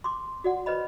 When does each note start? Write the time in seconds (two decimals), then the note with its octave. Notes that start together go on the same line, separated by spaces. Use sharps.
0.04 C6 D6
0.44 F#4 D5 F#5
0.66 B4 C5 D#5 B5